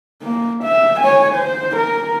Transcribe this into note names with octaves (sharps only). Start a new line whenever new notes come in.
A#3
E5
C#5 G#5
C5
A#4